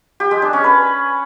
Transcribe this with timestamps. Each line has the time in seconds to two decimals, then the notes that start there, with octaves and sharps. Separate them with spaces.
0.20 G4
0.31 G#3
0.42 D4
0.53 C#4
0.64 B4